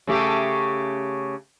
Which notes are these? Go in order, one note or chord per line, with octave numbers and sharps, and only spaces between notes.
C#3 A3 G4